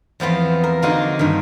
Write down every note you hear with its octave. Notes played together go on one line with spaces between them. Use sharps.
E2 F3 B3 C4
A#4
D3 A#3 D#4 F4 F#4
G2 D#3